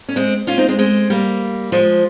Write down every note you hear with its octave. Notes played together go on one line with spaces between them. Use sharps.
C#4
G#3 C4
C#4 F4
C4 D#4
G#3 C4
G#3 C4
G3 A#3
F3 G#3